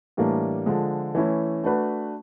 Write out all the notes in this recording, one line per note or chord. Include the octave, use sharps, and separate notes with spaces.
A2 E3 G3 A#3 D4
D3 F3 G#3
E3 A3 C#4 E4
A3 D4 F#4 B4